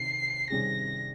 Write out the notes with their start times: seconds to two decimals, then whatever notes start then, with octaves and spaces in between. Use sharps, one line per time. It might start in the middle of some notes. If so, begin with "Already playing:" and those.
Already playing: C3 D#3 C7
0.50 C3 D#3 G3 C#4 G#4 A#6